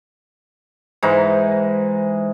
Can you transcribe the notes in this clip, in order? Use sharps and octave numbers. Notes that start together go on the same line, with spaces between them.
G#2 E3 D#4